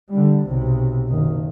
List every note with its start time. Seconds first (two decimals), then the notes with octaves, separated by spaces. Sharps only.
0.10 D3 G3
0.46 B1 C3
1.08 F#1 D#3